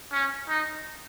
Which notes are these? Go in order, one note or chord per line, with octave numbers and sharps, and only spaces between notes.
C#4
D#4